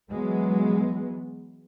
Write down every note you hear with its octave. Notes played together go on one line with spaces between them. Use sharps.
E3 F#3 G#3 B3